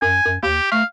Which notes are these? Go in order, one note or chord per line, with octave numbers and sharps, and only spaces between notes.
F#2 G#5
F#2
D#2 G4
A3 F5